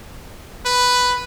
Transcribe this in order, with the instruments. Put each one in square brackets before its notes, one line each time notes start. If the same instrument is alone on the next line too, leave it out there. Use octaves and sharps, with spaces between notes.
[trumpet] B4